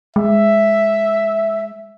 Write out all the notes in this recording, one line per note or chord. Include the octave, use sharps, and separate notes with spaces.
G#3 E5